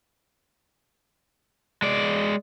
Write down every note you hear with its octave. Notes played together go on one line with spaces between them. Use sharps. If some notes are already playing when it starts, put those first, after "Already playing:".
G#3 D5